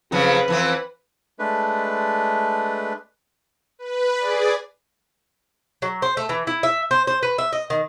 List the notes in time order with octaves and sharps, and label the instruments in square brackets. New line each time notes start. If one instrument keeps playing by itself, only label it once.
[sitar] F2 C#3 F#3 [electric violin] B4
[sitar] F2 E3 C4
[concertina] G#3 A3 D4 B4
[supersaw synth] B4
G#4 D5
[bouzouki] F#3
C5
A3
E3
E4
E5
C5
C5
B4
E5
D#5
D#3